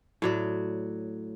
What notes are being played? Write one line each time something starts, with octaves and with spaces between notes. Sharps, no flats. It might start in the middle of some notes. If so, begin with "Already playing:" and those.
A2 F#3 D5